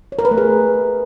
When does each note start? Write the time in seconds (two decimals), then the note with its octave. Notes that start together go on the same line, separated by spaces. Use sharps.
0.12 C#5
0.19 A#4
0.25 B4
0.31 A3
0.38 G#4